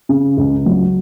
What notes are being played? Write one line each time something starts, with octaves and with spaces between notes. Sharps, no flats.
C#3
C#2
F#3